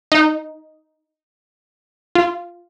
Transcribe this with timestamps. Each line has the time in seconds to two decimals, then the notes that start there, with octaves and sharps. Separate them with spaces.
0.12 D#4
2.15 F4